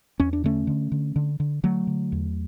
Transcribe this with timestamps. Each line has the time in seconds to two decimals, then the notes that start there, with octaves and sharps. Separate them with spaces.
0.20 E2 C#4
0.33 D4
0.44 D3 A3 C#4
0.67 D3
0.92 D3
1.16 D3
1.40 D3
1.63 D3 F#3 A3
1.87 D3
2.12 E2